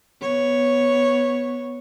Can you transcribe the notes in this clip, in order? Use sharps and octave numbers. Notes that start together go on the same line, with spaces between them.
B3 C#5